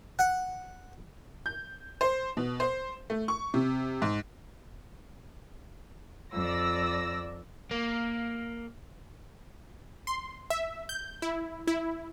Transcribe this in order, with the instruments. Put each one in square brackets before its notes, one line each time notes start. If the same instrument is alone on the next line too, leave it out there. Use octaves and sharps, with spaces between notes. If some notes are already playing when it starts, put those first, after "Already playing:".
[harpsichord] F#5
[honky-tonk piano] G6
C5
B2
C5
A3
C#6
C3
G#2
[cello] F2 [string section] D5 E6 A#6
[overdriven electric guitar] A#3
[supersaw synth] C6
E5
G6
E4
E4